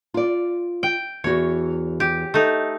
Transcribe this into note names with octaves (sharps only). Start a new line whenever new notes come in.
F4 D5
G5
E2 F#4 C#5
G4
A3 D#4